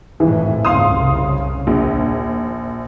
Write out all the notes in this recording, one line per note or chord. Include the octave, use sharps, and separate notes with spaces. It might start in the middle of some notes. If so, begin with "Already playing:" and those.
G#1 F2 A2 E3
F#1 C#2 G#2 F5 C6 D#6
C2 C#3
A#1 D#2